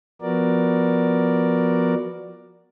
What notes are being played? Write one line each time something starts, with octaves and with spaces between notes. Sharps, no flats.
F3 B3 F#4 A#4 D5